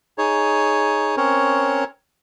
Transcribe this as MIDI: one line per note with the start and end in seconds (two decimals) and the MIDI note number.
0.18 1.16 63
0.18 1.16 68
0.18 1.16 73
1.17 1.84 60
1.17 1.84 61
1.17 1.84 70
1.17 1.84 73